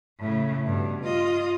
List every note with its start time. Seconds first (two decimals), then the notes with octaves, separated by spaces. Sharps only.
0.20 A2 C#3
0.65 G2 B2
1.01 F4 D#5